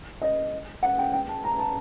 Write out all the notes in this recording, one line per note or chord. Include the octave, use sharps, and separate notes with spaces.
D#5
F#5
G5
G5
A5
A#5
A5